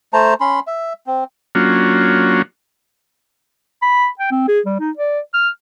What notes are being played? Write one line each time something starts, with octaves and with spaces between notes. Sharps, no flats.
A3 C5 A5 A#5
C#4 B5 C6
E5
C4
F#3 A#3 C#4 D4 F4 F#4
B5
G5
C4
G#4
G3
D#4
D5
F6